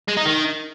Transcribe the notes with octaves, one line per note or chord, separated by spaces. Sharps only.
G#3
D#4
D#3